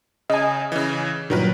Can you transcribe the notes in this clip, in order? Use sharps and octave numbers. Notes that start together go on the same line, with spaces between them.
C#3 D#5 G#5
C#3 E3
G2 A#2 D#3 F#3 A#4 B4